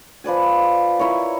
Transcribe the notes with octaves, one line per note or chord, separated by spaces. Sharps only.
F3 B4 D5 G#5
E4 A#4 C#5